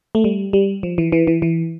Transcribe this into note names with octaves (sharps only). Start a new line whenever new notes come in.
A3
G3
G3
F3
E3
E3
E3
E3